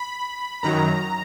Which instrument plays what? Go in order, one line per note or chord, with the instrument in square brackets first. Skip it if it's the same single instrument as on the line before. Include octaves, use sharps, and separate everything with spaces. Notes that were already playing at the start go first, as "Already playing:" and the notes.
Already playing: [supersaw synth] B5
F#2 D#3 F#3 A#5